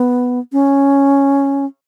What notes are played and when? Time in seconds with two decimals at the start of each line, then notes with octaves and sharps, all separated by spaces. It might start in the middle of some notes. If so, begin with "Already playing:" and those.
Already playing: B3
0.53 C#4